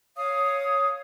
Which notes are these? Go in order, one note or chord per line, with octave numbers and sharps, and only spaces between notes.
C#5 F5 D#6